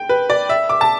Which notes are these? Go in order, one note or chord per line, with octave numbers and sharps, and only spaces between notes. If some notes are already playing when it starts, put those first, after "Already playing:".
Already playing: G5
B4
D5
E5
D6
A5